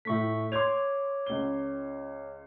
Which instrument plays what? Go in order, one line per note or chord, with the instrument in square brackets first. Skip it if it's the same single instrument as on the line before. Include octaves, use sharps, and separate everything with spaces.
[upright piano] A2 A3 [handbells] E5 C#6 B6
[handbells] C#5 D6 [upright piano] C6 G#6 F7
[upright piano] C#2 G7